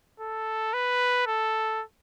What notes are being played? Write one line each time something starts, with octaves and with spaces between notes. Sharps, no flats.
A4
B4
A4